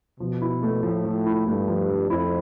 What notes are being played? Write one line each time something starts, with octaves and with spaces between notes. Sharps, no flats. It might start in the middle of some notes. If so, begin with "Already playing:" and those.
B2 F3
E4
A3
A2 F3
F3
E4
G2 A3
F3
F3
F2 E4